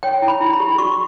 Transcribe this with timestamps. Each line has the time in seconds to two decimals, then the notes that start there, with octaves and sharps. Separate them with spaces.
0.03 C#5 G5
0.22 E4
0.28 B5
0.41 E4
0.53 B5
0.60 G4
0.78 F#4 C#6